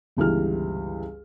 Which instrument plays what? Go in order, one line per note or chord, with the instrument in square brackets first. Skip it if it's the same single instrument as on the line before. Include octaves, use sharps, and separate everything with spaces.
[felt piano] G1 C#2 E3 G4 F6